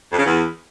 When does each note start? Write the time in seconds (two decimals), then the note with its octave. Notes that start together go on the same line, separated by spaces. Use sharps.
0.12 F2
0.19 C#3
0.26 E2